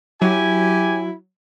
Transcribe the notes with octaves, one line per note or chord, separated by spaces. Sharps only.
F#3 E4 G4 G#5